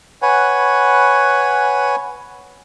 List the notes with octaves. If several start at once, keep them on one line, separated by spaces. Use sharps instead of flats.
B4 C#5 F#5 G#5